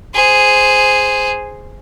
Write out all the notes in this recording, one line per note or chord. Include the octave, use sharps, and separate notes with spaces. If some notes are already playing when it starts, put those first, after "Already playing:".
G#4 C5